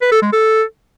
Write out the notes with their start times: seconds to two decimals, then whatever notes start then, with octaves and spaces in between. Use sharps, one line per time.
0.02 B4
0.12 A4
0.22 G#3
0.33 A4